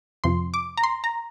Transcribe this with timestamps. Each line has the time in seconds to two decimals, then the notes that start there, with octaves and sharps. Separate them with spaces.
0.24 F2 C3 F3 C6
0.54 D6
0.77 A#5
0.84 C6
1.04 A#5